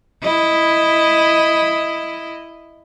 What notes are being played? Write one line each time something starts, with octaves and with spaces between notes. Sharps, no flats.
E4 D#5